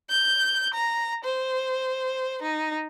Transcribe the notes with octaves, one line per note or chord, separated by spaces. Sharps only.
G6
A#5
C5
D#4